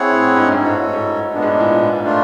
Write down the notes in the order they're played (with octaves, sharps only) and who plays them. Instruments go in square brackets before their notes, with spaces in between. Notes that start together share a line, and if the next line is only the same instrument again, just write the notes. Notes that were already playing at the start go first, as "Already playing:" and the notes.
Already playing: [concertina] C4 E4 G#4 C#5 F#5
[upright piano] A2
A2
G#2
G2
G#2
[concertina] F#4 A4 C#5
[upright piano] G#2
A2
[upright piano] A#2 [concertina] G#3 B3 D4
[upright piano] G#2
A2
A#2
[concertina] A3 D4 F4